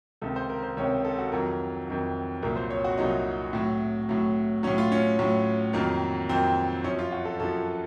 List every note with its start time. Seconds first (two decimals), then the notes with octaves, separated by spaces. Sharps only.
0.22 C#2 C3 D#3 A4
0.36 C5
0.49 A#4
0.63 C5
0.77 C#2 C3 D#3 C#5
1.05 A4
1.19 F#4
1.32 F2 D#3 F#3 A#4
1.88 F2 D#3 F#3
2.43 C2 A#2 F#3 A#4
2.56 C5
2.70 C#5
2.84 F#4
2.98 C2 A#2 F#3 D#4
3.53 A2 F#3
4.09 A2 F#3
4.63 F#3 C#4
4.67 A2
4.78 F4
4.92 C#4
5.19 A2 F#3
5.73 F2 D#3 F#3 A#3
6.29 F2 D#3 F#3 C4
6.84 F#2 F3 C#4
6.99 F4
7.12 F#4
7.25 A4
7.40 F#2 F3 A4